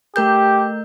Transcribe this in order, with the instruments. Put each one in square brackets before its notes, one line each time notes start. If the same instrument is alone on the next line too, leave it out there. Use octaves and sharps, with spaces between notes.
[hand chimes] A3 A#4 G6 [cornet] G4